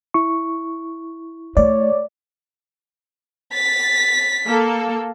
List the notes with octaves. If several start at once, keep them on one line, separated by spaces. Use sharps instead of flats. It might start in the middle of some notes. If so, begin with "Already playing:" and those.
E4 C#6
A3 C#5 D5
A6 B6
A#3 A4